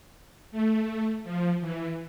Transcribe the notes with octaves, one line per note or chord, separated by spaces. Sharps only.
A3
F3
E3